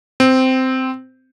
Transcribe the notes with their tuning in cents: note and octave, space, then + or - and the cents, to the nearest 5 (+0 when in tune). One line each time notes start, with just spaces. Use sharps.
C4 -10